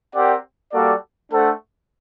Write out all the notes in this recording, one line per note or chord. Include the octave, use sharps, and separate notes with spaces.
C4 G4 A#4 D5 F#5
G3 A#3 F#4 A4 D5
A3 D4 A4 C5 F#5